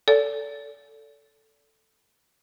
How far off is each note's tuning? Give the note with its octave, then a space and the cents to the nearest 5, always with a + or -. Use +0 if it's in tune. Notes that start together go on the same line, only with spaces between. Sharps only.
A4 +0 D5 -35